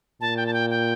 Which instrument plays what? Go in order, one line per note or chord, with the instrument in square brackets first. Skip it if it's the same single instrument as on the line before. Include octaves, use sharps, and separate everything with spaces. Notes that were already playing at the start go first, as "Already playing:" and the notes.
[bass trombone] A#2 [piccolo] A5
[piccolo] G5
A5
G5
G5